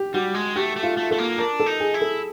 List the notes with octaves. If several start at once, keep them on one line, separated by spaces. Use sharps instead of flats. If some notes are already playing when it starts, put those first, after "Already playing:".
Already playing: G4
G3 F#4
G#3
A3 G4
A3
F4
A3
A3 A4
A#3
D4 A#4
A4
D#4
G#4
E4
A4